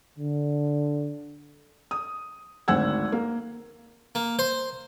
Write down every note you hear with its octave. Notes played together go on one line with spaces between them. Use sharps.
D3
D#6
G#1 D2 C4 F#5 E6 G#6
A#3
A#3
C5